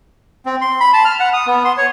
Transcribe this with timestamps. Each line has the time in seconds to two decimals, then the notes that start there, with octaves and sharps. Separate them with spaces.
0.46 C4
0.61 C6
0.80 B5
0.93 A5
1.05 F6
1.20 F#5
1.33 D#6
1.47 B3
1.64 C6
1.77 C#5